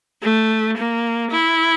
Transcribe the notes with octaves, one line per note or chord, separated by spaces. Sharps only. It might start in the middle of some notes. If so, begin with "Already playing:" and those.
A3
A#3
E4